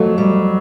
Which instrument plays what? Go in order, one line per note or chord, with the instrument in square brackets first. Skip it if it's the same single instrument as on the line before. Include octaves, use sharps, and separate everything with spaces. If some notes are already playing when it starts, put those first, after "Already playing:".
Already playing: [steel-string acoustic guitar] F2 A3 [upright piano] F#3
[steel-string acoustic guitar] G3